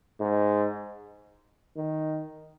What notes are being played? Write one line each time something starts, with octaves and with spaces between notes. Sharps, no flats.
G#2
D#3